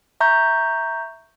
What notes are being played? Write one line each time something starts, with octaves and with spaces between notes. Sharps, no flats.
E5 A#5 C#6 G6